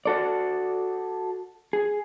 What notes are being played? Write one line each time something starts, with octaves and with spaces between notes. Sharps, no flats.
F#4 A4 D5
G#4